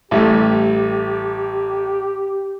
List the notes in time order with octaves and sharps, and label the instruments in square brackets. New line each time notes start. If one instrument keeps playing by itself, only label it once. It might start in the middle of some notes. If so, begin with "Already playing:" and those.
[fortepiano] A1 G3 A3 [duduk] G4